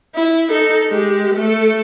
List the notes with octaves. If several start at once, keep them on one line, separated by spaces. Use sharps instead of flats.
E4
D#4 A4
G#3 G4
A3 A4